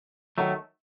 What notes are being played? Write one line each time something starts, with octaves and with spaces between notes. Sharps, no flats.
D#3 F#3 A3